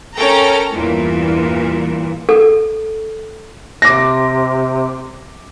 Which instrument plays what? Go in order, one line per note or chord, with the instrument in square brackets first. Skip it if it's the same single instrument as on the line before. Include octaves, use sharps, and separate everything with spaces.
[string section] C#4 A4 A#4 G5 A#5
E2 G2 A#2 E3
[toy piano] A4
[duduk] C3 [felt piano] D6 A#6